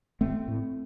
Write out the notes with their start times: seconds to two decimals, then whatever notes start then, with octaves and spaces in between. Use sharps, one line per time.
0.21 A1 A3 C4
0.48 A2